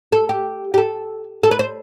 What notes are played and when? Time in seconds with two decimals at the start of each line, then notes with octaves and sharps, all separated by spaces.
0.12 A4
0.29 G4
0.74 G4
0.78 A4
1.43 A4
1.51 B4
1.59 C5